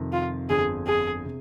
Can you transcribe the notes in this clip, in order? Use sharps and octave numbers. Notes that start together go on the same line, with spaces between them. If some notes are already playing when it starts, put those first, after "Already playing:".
Already playing: F2 C3 D#3
F4
G1 F2 D3 G#4
G#4
C3